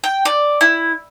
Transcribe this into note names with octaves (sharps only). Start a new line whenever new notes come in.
G5
D5
E4